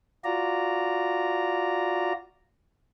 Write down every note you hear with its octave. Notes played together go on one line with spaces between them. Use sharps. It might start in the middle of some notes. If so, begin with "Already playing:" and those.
F4 F#4 D5 A#5